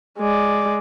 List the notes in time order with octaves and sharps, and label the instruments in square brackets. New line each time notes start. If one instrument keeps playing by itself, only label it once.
[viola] G#3 D5